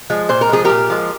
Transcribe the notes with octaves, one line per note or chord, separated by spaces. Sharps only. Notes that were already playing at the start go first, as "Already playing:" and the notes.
F3 G#3
A#2 C5
A#4
F3 G#3 G#4
A#2 G4 A#4
F3 G#3